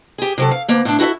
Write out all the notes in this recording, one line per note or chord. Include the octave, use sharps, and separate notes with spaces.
G4 G#4
C3 F#3 A4
F5
D2 A#3 B3
A2 D4
E4 F#4 G#4 A4 E5